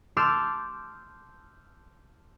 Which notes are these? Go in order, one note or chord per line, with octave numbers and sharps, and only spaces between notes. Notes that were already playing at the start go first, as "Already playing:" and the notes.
A5 C6 D6 E6 F6 G6